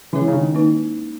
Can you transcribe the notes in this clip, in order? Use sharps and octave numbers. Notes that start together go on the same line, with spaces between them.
E3 G#3 C#4 E4 G#4 C#5
C#3
D#3
A#3 D#4 B4